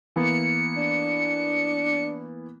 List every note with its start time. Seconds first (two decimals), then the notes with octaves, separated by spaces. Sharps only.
0.16 E3 A#3 B3 C#7
0.77 D4